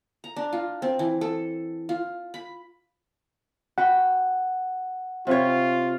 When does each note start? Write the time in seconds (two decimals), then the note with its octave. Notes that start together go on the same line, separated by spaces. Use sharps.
0.24 A#5
0.36 D4
0.53 F4
0.82 C4
0.99 E3
1.21 A4
1.89 F4
2.34 B5
3.78 F#4 B4 F#5 G5
5.27 C3 F4 B4 C#5